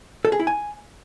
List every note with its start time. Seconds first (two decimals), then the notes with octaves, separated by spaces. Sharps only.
0.25 A4
0.32 G#4
0.40 E4
0.47 G#5